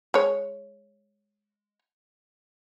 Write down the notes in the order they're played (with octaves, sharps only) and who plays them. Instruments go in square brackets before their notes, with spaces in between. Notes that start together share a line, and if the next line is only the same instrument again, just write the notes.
[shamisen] G#3 C#5